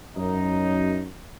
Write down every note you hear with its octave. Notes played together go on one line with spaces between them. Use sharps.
F#2 D#4